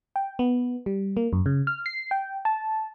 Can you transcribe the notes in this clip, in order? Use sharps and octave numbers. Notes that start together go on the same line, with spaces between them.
G5
B3
G3
A#3
F#2
C#3
F6
C7
G5
A5